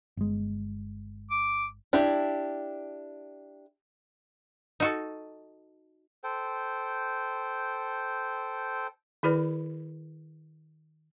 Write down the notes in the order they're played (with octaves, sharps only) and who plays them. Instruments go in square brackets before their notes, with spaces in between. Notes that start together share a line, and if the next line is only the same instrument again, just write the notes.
[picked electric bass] G1 G#3
[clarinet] D6
[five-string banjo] D4 E4 G4
[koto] D#4 F#4 A4
[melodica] A4 C5 G5
[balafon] D#3 E4 G#4 B4 D5